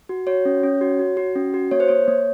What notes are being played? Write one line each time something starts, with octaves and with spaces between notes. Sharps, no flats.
F#4
F#4 C#5
C#4
C#4
F#4
F#4
F#4
C#4
F#4
A#3 C#5
C5
A#3 C#5
A#3